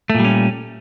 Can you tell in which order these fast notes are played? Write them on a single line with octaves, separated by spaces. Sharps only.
A3 A#2 G3 C#4